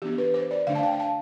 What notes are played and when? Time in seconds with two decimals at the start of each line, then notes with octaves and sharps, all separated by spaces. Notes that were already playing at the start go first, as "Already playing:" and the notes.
0.02 E3 B3 D4 G4
0.18 B4
0.34 C5
0.51 D5
0.67 D3 A3 D4 F5
0.75 A5
0.83 G5
0.92 F5
1.00 A5